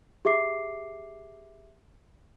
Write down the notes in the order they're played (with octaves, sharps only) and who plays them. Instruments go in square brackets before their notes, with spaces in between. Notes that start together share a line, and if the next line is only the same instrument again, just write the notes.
[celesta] G4 G#4 E5 D6 C7